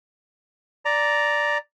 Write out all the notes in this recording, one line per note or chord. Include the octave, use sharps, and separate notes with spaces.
D5 A#5